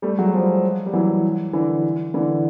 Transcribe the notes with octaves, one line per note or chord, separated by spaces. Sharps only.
G3 A3
F#3 G#3
F3 G3
G3
E3 F#3
D3 E3
D3 E3